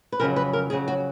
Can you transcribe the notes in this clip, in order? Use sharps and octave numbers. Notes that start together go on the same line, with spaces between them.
B4
F2 C#3 F#3 A#4
B4
A#4
F2 C#3 F#3 G#4
F#4